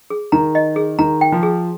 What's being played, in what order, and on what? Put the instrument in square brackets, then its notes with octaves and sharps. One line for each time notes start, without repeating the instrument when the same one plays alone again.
[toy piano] G#4
[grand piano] D#3 [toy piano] A#5
[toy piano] D#5
G#4
[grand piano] D#3 [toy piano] A#5
[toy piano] G5
[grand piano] F3
[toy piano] G#4